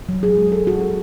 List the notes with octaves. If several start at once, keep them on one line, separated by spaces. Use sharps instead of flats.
F#3
G#4
G#3
A4
F#4
A4